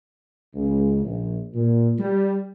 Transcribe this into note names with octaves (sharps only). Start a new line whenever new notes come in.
C#2
A#1
A#2
G3